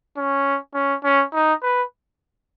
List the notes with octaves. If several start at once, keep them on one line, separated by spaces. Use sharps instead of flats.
C#4
C#4
C#4
D#4
B4